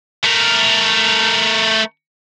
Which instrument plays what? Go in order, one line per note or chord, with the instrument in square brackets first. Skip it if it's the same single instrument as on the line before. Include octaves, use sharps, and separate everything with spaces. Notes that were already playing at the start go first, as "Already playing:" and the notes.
[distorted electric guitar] A3 A#4